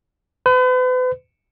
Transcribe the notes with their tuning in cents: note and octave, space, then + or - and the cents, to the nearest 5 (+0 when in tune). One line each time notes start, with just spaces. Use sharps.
B4 +40